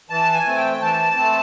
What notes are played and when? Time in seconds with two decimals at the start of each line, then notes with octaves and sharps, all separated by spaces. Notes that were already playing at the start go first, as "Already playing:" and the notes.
0.10 E3 A5
0.34 G#5
0.45 A3 C4
0.57 G5
0.81 E3 A5
1.17 A3 C4